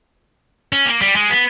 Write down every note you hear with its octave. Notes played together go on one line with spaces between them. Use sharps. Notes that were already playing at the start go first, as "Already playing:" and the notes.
C#4
A#3
G3
G#3
B3